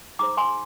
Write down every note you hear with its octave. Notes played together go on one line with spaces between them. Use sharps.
D#4 G#4 C5 A#5 D6
G#5 C6